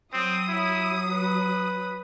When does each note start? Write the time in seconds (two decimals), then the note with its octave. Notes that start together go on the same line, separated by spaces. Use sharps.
0.13 F#3 C4 D#6
0.48 E4
1.12 B4